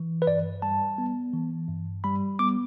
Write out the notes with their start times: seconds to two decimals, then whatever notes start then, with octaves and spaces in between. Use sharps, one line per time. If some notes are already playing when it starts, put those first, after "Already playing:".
Already playing: E3
0.22 B4
0.27 G2 D5
0.62 G3 A5
0.98 B3
1.34 E3
1.68 G2
2.04 G3 B5
2.39 B3 D6